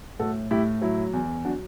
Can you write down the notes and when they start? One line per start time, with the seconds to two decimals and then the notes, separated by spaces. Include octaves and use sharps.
0.19 A2 F#4 A4
0.51 A2 E4 G4
0.82 F#3 E4
1.13 E2
1.45 F#3 D4 F#4